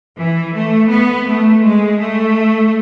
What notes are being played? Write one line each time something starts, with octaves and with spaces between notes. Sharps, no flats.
E3
A3
B3
A3
G#3
A3